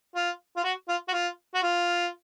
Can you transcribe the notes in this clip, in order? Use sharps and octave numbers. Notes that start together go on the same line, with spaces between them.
F4
F4
F#4
F4
F#4
F4
F#4
F4